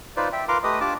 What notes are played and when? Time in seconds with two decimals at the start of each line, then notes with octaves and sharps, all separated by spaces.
0.17 D#4 F4 B4 C5 D5
0.33 E5 G5
0.48 F4 A#4 B4 A#5 C6 D6
0.64 A3 G4 B4 D#5 D#6
0.81 D4 F4 G4 D5 A5 D6